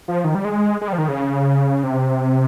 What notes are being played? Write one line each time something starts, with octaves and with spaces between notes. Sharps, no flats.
F3
D#3
G3
G#3
G#3
G3
F3
D#3
C#3
C3